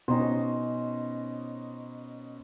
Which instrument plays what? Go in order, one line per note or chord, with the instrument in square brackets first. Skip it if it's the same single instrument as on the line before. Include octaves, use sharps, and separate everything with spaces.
[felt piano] B2 [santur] C#4 D#4 C5